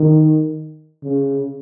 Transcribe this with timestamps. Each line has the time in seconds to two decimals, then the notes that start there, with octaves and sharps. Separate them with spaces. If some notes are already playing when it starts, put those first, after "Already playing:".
Already playing: D#3
1.04 C#3